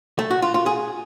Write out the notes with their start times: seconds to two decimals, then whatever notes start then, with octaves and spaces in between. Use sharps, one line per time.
0.19 A3
0.31 F#4
0.42 F4
0.54 F4
0.66 G#4